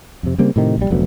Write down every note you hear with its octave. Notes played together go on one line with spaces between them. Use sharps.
F2 C3
C#3 G3 A#3 C4
A2 C3 D#3
A#1 G3
F1 D2 F#3 B3